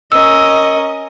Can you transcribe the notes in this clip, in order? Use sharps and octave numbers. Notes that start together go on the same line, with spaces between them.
C#4 A#4 D#5 E6